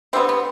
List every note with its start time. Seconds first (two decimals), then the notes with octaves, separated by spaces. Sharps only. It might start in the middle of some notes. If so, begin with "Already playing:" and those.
0.13 D3 G3 B3 C4
0.29 B3